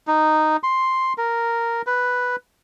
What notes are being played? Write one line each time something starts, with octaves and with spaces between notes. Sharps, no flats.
D#4
C6
A#4
B4